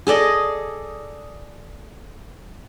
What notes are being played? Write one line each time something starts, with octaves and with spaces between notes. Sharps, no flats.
G#4 A4 D5 D#5